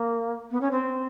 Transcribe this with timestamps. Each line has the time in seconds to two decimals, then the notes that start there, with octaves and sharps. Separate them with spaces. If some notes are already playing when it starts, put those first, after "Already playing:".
Already playing: A#3
0.51 B3
0.61 C#4
0.71 C4